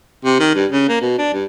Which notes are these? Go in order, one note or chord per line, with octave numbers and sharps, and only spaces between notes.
C3
D#3
G2
C#3
A#3
B2
D4
G2